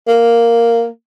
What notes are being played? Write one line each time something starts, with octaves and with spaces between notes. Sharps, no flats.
A#3